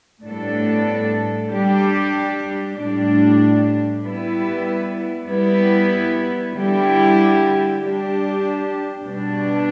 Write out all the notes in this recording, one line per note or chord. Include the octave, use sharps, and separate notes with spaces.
A2 G3 B3 D4 A4
G3 D4 G4
A2 G3 D4
G3 B3 E4 B4
G3 B3 E4 B4
D3 G3 E4 G4
G3 D4 G4
B2 G3 D4